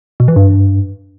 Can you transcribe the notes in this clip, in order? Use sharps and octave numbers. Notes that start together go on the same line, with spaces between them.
B2
E3
G2